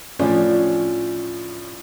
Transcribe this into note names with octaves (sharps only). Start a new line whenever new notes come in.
A2 F3 C#4 D4